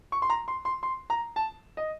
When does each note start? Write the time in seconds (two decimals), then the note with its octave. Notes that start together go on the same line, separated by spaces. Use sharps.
0.12 C#6
0.22 C6
0.30 A#5
0.48 C6
0.65 C6
0.83 C6
1.10 A#5
1.36 A5
1.77 D#5